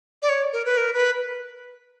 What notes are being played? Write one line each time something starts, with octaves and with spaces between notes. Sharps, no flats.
D5
C#5
A#4
B4
A#4
B4